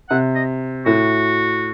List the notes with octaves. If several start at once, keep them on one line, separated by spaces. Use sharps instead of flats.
C3 F#5
D#5
A2 F#4